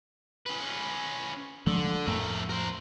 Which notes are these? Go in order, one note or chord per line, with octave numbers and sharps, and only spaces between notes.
C#4 B4
D3 F3 G#3 A3
F2 A2 A3 A#4
A#4 C5